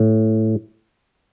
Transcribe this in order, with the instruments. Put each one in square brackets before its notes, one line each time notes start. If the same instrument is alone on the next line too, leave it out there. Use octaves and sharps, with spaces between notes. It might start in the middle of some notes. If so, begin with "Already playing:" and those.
Already playing: [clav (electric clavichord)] A2